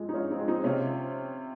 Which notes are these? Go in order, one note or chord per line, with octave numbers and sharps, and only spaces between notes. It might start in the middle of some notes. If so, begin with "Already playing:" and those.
Already playing: G#2 F3 G#3 C4
D#4
G#2 C#4 F4
C4 D#4
F3 G#3
C4 D#4
C3 C#4 F4